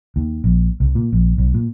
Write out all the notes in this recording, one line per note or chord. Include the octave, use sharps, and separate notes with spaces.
D#2
A#1
C2
A#2
A#1
B1
A#2